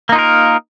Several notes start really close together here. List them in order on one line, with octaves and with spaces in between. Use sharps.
A#3 D#4 F4 A#4